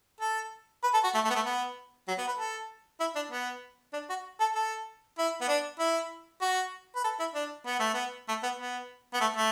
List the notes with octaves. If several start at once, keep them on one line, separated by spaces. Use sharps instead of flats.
A4
B4
A4
F#4
A3
A3
B3
A3
B3
F#3
B3
B4
A4
E4
D4
B3
D4
F#4
A4
A4
E4
B3
D4
E4
F#4
B4
A4
E4
D4
B3
A3
B3
A3
B3
B3
B3
A3
A3